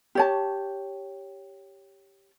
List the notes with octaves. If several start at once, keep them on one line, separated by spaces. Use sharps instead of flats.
G4 C#5 A5